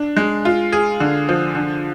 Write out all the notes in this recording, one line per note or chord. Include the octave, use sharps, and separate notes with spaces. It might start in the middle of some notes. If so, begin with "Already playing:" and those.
Already playing: D4
G#3
F4
G#4
D3
F3
D3